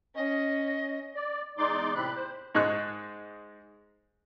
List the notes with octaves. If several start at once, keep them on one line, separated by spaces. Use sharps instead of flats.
C#4 D#5
D5
E2 G#3 D#4 D5 C6 D6
A2 C3 C4 B5 F#6
C5
G#2 G#3 C#6 F#6